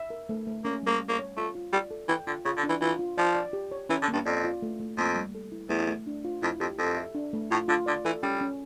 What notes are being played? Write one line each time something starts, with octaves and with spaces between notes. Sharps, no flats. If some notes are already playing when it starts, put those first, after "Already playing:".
Already playing: E5
A#4
A3
A3
A#3 C#4
G3 A#3
F5
A#3
C#5
A3 F4
F4
G3 D5
A4
E3 G5
D3 F4
C#3 F4
D3
D4
E3
E3 F4
F4
F3 D5
D5
G4
C#5
E3 C#4
D3
A#3
G2
F2 D5
F4
A3
A3
F2 A#3
G3
A4
E4
E2 A3
A3
D4
F4
F2 E4
F2 G4
F2 A4
E5
D4
A3
A2 F4
D3 F4
D3 D5
E3 A4
G3 C#4
C#4